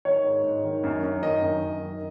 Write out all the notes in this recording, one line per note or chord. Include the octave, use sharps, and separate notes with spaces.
D#3 C#5
G#2
G#2
D#3
F#2
F#2
D#3 D#5
F#2
F#2
D#3